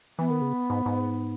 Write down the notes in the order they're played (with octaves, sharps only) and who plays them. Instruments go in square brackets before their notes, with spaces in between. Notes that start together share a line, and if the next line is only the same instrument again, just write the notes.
[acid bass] E3 [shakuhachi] B3
[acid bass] D#3
C#3
G#2
G#2